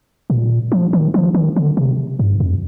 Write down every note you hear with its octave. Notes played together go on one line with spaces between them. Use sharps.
A#2
F3
D#3
F3
D#3
D3
C3
G2
F2